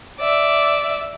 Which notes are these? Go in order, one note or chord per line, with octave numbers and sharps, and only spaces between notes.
D5 E5